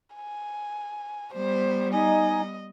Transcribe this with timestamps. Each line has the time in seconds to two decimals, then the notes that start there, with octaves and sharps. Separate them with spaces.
0.15 G#5
1.34 G3 B3 C5
1.93 D#4 D#5 G#5